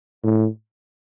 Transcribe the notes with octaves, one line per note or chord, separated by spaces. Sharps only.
A2